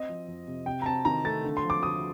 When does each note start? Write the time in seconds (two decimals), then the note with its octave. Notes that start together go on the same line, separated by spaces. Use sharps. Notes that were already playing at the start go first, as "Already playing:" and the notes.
Already playing: C4 D#5
0.09 F3
0.28 F2
0.48 C3
0.66 C3 G5
0.82 A#5
0.86 C4 A5
1.05 D#3 A#5
1.24 A3 A6
1.44 D3
1.57 C6
1.64 F3
1.70 D6
1.83 D2 D#6